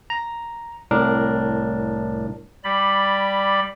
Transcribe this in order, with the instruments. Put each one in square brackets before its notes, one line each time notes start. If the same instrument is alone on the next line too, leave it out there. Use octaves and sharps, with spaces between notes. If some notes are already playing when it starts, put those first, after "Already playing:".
[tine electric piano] A#5
C2 A2 D4 A#4
[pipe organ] G3 D5 B5